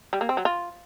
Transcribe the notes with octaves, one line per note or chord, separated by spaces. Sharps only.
G3
A#3
C4
F#3
F4